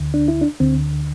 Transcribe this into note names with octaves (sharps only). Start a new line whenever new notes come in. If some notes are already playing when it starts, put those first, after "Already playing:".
Already playing: D2 D3
D4
E4
D4
D2 D3 C4